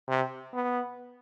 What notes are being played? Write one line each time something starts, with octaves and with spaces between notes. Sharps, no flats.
C3
B3